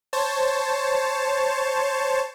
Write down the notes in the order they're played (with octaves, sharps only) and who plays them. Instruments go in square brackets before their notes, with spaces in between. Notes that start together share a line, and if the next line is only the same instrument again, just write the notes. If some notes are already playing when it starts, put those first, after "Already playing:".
[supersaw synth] C5 C#5 A5